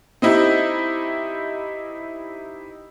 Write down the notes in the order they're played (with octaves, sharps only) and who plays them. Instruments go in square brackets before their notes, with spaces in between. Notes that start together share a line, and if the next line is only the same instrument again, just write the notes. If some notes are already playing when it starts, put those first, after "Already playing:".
[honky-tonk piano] C4 D#4 E4 G4